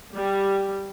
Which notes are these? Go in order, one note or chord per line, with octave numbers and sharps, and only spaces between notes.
G3